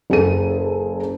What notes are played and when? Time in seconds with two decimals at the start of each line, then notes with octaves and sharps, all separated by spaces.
0.10 F#1 G#4 A4 D#7